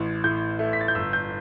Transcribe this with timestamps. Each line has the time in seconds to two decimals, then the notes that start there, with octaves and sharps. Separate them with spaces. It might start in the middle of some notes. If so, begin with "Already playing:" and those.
Already playing: A1 A2
0.24 A2 G6
0.59 A3
0.73 B6
0.81 A6
0.88 G6
0.95 G1 E6
1.13 G6